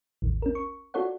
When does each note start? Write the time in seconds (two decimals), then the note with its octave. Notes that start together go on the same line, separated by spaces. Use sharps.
0.22 A1 D#2
0.42 C#4 A#4
0.55 C#6
0.94 F4 F#4 A4 C#5 D5 F#5